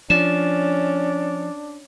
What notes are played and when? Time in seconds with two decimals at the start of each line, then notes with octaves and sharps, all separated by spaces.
0.10 F3 C#4 D4 E7